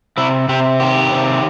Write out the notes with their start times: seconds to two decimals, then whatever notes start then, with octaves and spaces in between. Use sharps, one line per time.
0.17 C3 E4
0.49 C3 G4
0.80 D#3 G4
1.12 C3